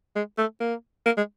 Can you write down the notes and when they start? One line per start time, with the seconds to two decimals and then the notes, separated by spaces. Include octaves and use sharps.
0.16 G#3
0.38 A3
0.60 A#3
1.06 A#3
1.17 G#3